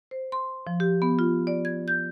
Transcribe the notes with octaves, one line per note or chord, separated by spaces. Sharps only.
C5
C6
F3
G4
B3
F4
D5
G#6
G6